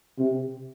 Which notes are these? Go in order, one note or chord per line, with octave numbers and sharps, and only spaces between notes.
C3